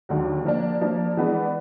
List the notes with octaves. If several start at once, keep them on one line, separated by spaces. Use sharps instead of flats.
D#2 D3 F#3
F3 A#3 D4
F3 A#3 D4
E3 G#3 B3 D4